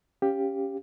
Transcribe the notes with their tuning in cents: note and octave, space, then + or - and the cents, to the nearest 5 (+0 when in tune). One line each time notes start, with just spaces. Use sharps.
C#4 +0 G4 +10 F5 +0